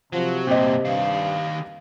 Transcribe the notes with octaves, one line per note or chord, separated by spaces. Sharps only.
C3 F3 F#3
G2 A#2 C4 G4 D#5
G2 D#3 F5